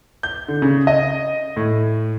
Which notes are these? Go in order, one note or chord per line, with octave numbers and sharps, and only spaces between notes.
G6
D3
C#3
D#5
A2